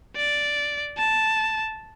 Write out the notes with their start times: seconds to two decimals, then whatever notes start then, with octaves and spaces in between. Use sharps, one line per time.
0.17 D5
0.98 A5